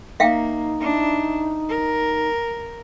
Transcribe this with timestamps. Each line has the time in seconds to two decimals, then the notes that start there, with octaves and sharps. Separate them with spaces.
0.20 A#3 D#4 E5 F5 G5
0.80 D4 E4
1.69 A#4